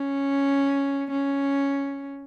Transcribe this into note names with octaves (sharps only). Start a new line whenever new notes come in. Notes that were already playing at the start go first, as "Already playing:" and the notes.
Already playing: C#4
C#4